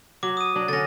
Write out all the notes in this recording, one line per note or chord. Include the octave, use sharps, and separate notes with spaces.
F#3 D6
D#6 D#7
F#3 D4
D3 C#4 A6 A#6